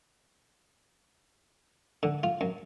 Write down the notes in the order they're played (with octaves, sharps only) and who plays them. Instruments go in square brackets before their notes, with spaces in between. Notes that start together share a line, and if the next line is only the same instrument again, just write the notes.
[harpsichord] D3
F4
F#2